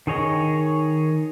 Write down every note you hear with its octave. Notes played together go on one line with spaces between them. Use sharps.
D#3 G#4 C#5 D#5